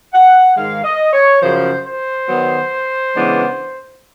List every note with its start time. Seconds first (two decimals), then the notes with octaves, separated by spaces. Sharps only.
0.13 F#5
0.57 G#2 D#3 G#3 F5
0.84 D#5
1.13 C#5
1.42 F#2 C#3 F3 C5
1.85 C5
2.28 D#3 F#3 B3
3.14 C#3 E3 G#3 B3 D4